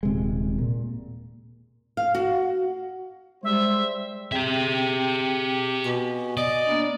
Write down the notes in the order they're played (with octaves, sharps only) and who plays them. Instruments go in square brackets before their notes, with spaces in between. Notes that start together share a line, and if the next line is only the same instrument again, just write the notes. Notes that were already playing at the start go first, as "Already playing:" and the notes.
[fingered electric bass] D#1 C3 G#3
A#2
[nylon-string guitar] F5
F#4
[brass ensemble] G3 C5 [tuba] G#3 [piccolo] E5
[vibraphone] C4 G#4 G5 [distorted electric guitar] G4 E5
[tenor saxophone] B2 [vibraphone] G#5
[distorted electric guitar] D5 [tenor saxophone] D#5
[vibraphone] A#3 B3 D4